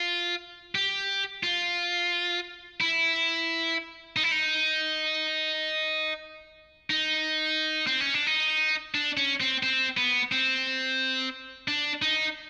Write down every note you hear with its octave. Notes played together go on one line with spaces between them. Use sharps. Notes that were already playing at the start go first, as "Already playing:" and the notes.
Already playing: F4
G4
F4
E4
D#4
E4
D#4
D#4
C4
C#4
D4
D#4
D4
C#4
C4
C4
B3
C4
D4
D#4